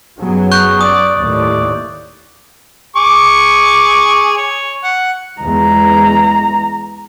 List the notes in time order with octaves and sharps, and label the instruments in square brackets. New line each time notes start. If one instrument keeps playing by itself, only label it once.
[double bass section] F#2 F#3 B3 [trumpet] G#4
[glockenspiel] C#6 F#6 G6
[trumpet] D5 [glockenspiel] D#6
[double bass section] D#2 A2 [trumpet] D5
[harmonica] G#4 C#6 D6
C#5
F#5
[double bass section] E2 E3 G#3 [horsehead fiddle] A#5